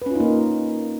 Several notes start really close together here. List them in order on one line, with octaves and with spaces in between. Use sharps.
B4 C#4 F4 D#4 A#3